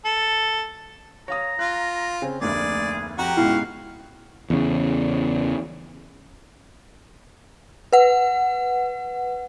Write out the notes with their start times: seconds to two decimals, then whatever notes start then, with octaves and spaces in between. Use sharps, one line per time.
0.05 A4
1.28 C#5 F5 A#5 D#6
1.59 F4 F#6
2.22 C#3 C4 G#5
2.41 F1 D2 A#3 G#4 D5
3.19 F2 F#4 G4 A#5
3.37 C#2 G#2 B2 E4 F5
4.50 E2 C#3
7.93 B4 F#5